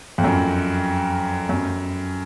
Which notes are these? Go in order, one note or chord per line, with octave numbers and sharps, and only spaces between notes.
F2
F#2
F#2